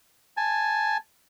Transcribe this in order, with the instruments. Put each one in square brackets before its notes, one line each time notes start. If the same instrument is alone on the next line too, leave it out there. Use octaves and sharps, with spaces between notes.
[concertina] G#5 A5